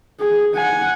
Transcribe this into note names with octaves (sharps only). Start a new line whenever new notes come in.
G#4
F#5 G#5